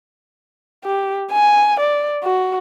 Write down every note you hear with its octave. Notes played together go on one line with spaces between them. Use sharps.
G4
G#5
D5
F#4